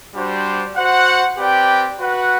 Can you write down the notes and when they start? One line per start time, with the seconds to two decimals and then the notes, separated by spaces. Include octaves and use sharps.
0.14 G3 D4 F#4 C5
0.76 F#4 C5 F#5
1.37 C4 G4 B4 D5 G5
1.99 F#4 B4 F#5